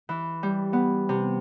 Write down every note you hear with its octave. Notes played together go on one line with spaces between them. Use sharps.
E3
G3
B3
C3